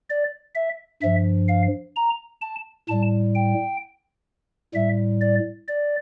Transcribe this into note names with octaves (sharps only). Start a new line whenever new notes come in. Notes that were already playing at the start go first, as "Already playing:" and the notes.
D5
E5
G2 F3 E5
F5
A#5
A5
A2 G3 A5
G5
A2 G3 E5
D5
D5